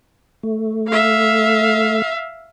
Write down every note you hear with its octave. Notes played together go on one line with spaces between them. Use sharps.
A3
E5 F5